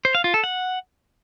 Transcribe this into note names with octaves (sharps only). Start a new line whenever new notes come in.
C5
F5
F4
A4
F#5